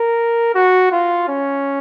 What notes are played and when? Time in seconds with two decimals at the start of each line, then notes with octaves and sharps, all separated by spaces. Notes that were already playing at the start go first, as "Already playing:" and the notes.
Already playing: A#4
0.55 F#4
0.92 F4
1.28 C#4